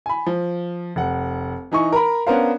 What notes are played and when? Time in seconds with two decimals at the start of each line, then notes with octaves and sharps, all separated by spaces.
0.06 G#5 B5
0.26 F3
0.96 F1 F#5
1.72 E3 D#4 G#5 C#6
1.92 A#4 A#5 B5
2.27 B3 C#4 D4 A#4 C5 F5